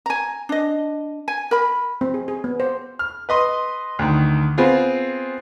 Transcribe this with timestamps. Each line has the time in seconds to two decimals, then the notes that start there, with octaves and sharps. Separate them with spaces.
0.06 G#5 A#5
0.49 D4 D#5
1.28 G#5
1.51 A#4 B5
2.01 C4
2.14 G#4
2.28 G#4
2.44 B3
2.60 C5
2.99 F6
3.29 B4 D#5 C6
3.99 D2 D#3
4.58 B3 C4 F4 G#4